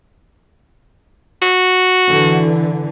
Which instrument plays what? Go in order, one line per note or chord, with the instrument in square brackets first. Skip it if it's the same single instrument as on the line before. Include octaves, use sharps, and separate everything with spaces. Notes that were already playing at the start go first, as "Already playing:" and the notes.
[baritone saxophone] F#4
[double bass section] D3 E3